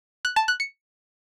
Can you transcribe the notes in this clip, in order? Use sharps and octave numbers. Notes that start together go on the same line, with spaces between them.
F#6
A5
F#6
C#7